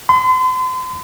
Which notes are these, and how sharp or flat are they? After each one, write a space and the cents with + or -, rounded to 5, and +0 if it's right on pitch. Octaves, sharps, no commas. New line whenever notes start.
C6 -40